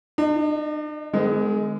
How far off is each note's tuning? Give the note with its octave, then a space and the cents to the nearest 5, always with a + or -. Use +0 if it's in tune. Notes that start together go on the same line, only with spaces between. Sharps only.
D4 +45 D#5 +0
D#3 -40 G#3 +10 C4 -45